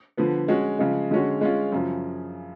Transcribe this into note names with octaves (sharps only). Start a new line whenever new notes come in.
D3 F3 B3
G#3 C#4 F#4
C#3 F3 G#3
D3 G#3 C#4 F#4
G#3 C#4 F4
F#2 C#3 F3